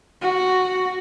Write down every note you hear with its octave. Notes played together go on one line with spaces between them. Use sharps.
F#4